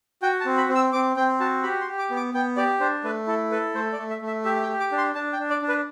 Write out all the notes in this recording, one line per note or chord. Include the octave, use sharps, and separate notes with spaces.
F#4 G5
A5
C4
B5
C4
E6
C4 D6
C4 G5
F#4 A5
G4 B5
C6
G4
D6
B3
D6
B3 G5
G4 D5
D4 C5
A3 B4
E4 A4
A4 B4
A3 C5
D5
A3
E5
A3
E5
G4 E5
G5
G4
D6
D4
C6
D4 A5
G5
D4
D5
D4
B4